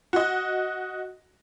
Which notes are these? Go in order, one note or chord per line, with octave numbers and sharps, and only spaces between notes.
F#4 D#5